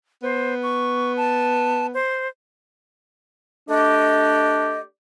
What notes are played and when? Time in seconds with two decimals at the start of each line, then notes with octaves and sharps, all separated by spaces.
0.23 B3 C5
0.63 C#6
1.17 A5
1.94 C5
3.69 A3 D4 G4 D5 D#5